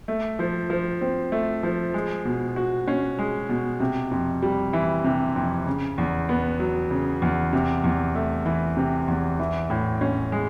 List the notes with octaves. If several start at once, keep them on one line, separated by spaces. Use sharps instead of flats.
A3
F3
F3
C4
A3
F3
G#3
B2
F#4
C#4
G#3
B2
C3
F2
G3
E3
C3
F2
C#3
E2
B3
F#3
C#3
E2
C3
E2
A3
E3
C3
E2
E3
A2
C#4
G#3